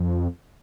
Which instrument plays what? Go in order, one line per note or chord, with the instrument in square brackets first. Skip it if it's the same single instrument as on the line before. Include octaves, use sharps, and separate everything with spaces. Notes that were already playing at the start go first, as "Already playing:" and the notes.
Already playing: [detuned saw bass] F2